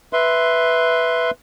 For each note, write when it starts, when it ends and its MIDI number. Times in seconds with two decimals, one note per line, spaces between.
0.13 1.31 71
0.13 1.31 76
0.13 1.31 84